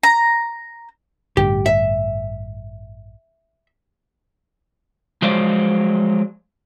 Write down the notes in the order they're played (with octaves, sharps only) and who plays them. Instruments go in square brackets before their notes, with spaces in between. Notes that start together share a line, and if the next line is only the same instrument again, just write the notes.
[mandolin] A#5
[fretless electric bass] A1 G2 D3 [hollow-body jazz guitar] G4
[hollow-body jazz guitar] E5
[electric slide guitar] F3 F#3 G#3 C5 D5 F5